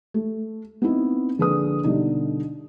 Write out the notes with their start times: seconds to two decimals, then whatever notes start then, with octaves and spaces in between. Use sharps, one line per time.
0.14 A3
0.82 B3 C4 D#4 E4
1.38 A#1 D3 G#4 B4 D#6
1.84 B2 D3 G3 D#4